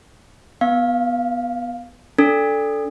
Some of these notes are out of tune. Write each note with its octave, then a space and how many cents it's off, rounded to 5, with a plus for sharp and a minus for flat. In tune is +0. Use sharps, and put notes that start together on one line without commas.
B3 +0 F5 +10
D4 -20 A4 +0